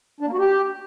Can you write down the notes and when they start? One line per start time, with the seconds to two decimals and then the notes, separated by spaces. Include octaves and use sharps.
0.20 D4
0.27 A#3
0.33 F#4
0.39 G4